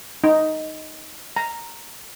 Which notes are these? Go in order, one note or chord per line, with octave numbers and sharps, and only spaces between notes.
D#4
A#5